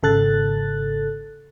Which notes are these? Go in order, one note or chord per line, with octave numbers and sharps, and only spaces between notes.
G#1 C#3 A4 F#6 A6